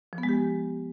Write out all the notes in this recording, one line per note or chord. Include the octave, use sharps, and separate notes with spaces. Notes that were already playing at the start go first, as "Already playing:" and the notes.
F3
B3
G#3
G4